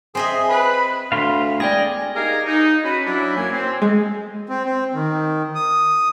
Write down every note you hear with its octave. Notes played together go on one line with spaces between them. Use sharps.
C4 G#4 D#5 E5
B4 B5
D2 F5 B5 C6
E1 G#4 D5 G5 A#6
D#4 G4 G#4 A#4 F5 G#5
D#4
C#4 F#4 B4
F#3 D4 E4
F#2 A#3 C#5 G#5
C4
G#3
C4
C4
D#3
D#6